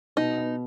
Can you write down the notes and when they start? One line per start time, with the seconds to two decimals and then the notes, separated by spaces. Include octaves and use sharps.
0.17 B2 D#4
0.38 B3